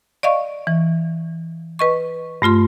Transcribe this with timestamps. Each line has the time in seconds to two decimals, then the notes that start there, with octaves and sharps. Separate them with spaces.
0.23 D5 D#5 F5 C#6
0.67 E3
1.79 B4 D#5 C#6
2.42 G2 A3 F4 C6